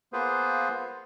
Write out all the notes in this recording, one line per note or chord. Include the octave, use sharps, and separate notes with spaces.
A#3 B3 F4 G#4 B4 C5